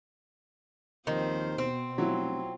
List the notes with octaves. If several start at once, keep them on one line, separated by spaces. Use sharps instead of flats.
D#2 D#3 F3 C4 C5
B2 C4
F1 F#3 E4 F4